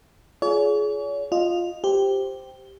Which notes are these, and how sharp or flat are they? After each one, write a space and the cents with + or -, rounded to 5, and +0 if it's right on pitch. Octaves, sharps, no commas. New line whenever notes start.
F4 +0 G#4 +25 C#5 +45
F4 +0 D#5 -10
G4 +0 C5 +0